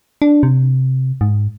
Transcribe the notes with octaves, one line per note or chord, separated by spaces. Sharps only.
D4
C3
G#2